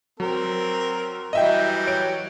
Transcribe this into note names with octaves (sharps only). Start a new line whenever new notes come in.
F#3 C4 A#4
E3 F#3 G3 D#5 E5 G5
C#5 D7